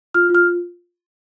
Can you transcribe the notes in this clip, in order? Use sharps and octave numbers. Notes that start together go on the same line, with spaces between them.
F4 F6
F4
F6
F4